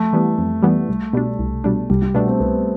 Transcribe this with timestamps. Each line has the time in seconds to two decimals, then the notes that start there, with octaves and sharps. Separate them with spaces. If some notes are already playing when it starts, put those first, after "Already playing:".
Already playing: F2 A3
0.13 E3 G3 B3
0.38 F2
0.63 E3 G3 B3
0.89 C2
1.13 B2 G3 D4
1.39 C2
1.64 B2 G3 D4
1.90 C2 G3
2.02 G3
2.14 B2 A3 B3 D4
2.28 C4
2.40 C2 B3